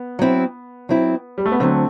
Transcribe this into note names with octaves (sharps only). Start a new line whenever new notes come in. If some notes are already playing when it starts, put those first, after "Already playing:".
Already playing: B3
F#3 C4 E4
F#3 C4 E4
G3
A3
B3
D2 D3 F#3 A3 C4